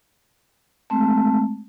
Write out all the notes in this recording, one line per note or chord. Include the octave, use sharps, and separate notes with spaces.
G#3 A3 C4 A5